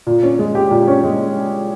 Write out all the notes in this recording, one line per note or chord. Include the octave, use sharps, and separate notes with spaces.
A#2
C#4
G#3
G4
A#2
C#4
G#3